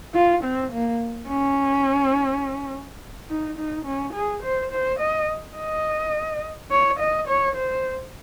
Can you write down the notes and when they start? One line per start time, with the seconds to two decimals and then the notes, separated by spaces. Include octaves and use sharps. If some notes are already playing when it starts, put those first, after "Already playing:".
0.14 F4
0.44 C4
0.72 A#3
1.29 C#4
3.29 D#4
3.58 D#4
3.85 C#4
4.14 G#4
4.43 C5
4.72 C5
4.99 D#5
5.57 D#5
6.71 C#5
7.00 D#5
7.28 C#5
7.56 C5